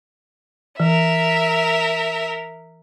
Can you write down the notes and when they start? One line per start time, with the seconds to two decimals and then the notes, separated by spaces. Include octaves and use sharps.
0.80 E3 A#4 E5